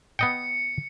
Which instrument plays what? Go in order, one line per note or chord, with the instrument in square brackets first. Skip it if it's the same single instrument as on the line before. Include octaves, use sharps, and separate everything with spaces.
[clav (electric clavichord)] B3 D#5 G5 [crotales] C#7